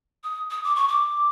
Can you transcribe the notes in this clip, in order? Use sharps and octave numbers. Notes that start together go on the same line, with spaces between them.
D#6
D#6
D6
C#6
D6